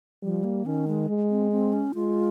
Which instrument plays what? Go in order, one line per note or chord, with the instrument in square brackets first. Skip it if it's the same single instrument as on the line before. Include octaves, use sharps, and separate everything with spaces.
[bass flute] F3 [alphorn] G3
[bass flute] A#3
[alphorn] D#3 [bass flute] C#4
[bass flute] G#3
[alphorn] G#3
[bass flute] C4
C4
C#4
[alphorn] G#3 [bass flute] F4